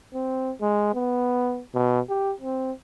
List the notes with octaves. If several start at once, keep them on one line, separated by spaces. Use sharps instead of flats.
C4
G#3
B3
B2
G4
C4